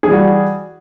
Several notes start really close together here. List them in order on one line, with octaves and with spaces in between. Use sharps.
G#4 E3 G3 F#4